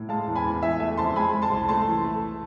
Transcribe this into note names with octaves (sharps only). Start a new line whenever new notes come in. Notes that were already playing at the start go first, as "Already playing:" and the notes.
Already playing: A2
G#3 F5 A5
E2
G#5 B5
E2
E3 E5 G#5
A3 E5 G#5
F2 A5 C6
G#3 G#5 B5
G#3
A5 C6
C2
A3 A5 C6
E3
A3